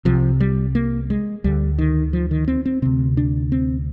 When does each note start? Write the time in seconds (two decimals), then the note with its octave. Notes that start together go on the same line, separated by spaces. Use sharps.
0.05 C2 C3 F3
0.40 G3
0.75 A#3
1.10 G#3
1.44 D2 D3 G3
1.79 D#3
2.13 F3
2.31 D#3
2.48 C4
2.66 C4
2.82 D2 C3 C4
3.17 D4
3.52 C4